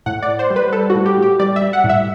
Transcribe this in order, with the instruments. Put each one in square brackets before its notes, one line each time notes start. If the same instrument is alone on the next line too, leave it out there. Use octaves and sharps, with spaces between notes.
[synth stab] A2 F#5
D5
A2
C5
G3
B4
G3 A4
F#4
A2
G4
A2
G4
G3 D5
E5
G3
F#5
A2
E5